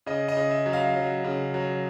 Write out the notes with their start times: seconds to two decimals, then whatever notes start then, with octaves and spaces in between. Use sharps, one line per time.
0.06 C#3 D#5
0.28 D#5
0.37 C#3
0.50 E5
0.66 F#3
0.73 F5
0.96 F#3
1.24 C#3
1.54 F#3